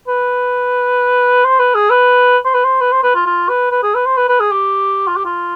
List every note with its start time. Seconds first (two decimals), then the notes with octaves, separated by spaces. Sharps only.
0.08 B4
1.44 C5
1.59 B4
1.75 G#4
1.90 B4
2.45 C5
2.54 B4
2.64 C5
2.81 B4
2.92 C5
3.03 B4
3.15 F4
3.26 F4
3.49 B4
3.71 B4
3.83 G#4
3.95 B4
4.06 C5
4.17 B4
4.29 B4
4.40 G#4
4.51 G4
5.08 F4
5.16 G4
5.25 F4